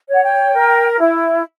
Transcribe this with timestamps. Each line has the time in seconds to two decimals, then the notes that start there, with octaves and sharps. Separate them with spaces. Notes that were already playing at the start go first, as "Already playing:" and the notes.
0.08 C#5
0.14 F#5
0.23 G5
0.54 A#4
1.00 E4